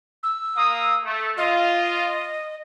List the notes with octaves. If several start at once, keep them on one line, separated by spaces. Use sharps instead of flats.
E6
A#3 F5 D#6
A3
F4 D#5